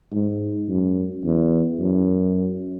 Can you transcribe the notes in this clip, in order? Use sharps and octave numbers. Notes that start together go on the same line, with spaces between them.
G#2
F#2
E2
F#2